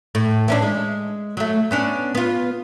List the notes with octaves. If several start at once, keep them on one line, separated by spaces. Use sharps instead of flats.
A2
E3 C#4 D4
G#3
F#3 A3
B3 C#4 D4
B3 F4